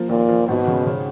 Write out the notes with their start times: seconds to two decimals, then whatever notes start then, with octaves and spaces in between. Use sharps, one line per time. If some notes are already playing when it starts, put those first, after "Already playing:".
Already playing: F3 A#3
0.09 D#2 A#2
0.29 F3
0.48 G#1 B2
0.67 C#3
0.87 C#3